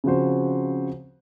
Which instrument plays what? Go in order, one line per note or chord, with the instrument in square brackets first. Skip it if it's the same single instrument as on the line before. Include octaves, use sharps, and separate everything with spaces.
[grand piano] C#3 F3 C4 F#4 C5